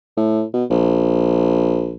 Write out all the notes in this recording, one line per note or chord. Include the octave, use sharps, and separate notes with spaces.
A2
B2
A#1